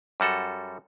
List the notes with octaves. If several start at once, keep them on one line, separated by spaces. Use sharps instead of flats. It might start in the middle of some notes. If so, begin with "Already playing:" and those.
F#2 G3 F#4 A4